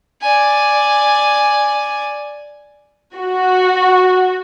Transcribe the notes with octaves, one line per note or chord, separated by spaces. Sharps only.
D5 G#5
F#4